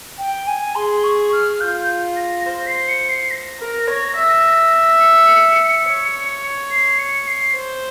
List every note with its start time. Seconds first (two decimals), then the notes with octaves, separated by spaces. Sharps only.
0.19 G5
0.47 G#5
0.75 G#4 C6
1.04 C#6
1.32 F6
1.60 F4 G6
2.17 A#6
2.45 C5 A#6
2.67 C7
2.89 C#7
3.09 C7
3.31 A#6
3.60 A#4
3.87 C#5
4.15 E5
5.01 C#7
5.86 C#5
6.71 C7
6.99 C#7
7.28 C7
7.55 C5